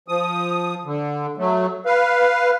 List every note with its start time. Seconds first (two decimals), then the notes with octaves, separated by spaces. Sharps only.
0.08 F3 D#6
0.85 D3
1.38 F#3 A3
1.86 B4 F5